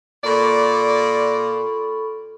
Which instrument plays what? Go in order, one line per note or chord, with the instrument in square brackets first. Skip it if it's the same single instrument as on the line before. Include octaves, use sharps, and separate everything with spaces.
[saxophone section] A#2 D5 [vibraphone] A4 B5 C#6